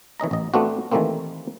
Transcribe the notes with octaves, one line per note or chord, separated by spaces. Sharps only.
E3 C#4 D#5 A#5
A1 D#5
A3 B3 C4 D4 F4 F#4
D#3 E3 G3 A3 A#3 C4